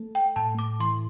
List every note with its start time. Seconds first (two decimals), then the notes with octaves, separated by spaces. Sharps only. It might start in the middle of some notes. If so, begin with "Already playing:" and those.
Already playing: A3
0.15 G5
0.36 A2 A5
0.59 D6
0.80 E3 C6